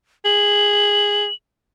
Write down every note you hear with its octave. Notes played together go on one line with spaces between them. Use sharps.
G#4 F#7